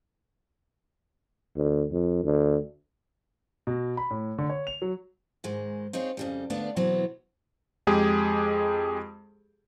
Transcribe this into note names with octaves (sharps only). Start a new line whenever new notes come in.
D2
F2
D2
B2
B5
A2
D3
C#5
F7
F#3
G#2 D#3 G#3
C4 D#4 F4 G#4 C#5
F2 C#3 G3
D2 A3 B3 D4 D5 F5
B2 E3 F#3 B3 C4
F2 G#3 G4 G#4